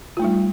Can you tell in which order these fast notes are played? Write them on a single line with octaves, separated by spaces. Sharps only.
F4 A3 D#4 G3